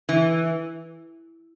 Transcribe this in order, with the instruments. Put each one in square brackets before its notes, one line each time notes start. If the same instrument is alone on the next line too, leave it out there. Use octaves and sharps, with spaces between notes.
[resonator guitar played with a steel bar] E3